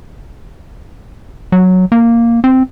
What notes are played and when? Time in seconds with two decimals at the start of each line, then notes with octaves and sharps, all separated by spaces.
1.52 F#3
1.92 A#3
2.44 C4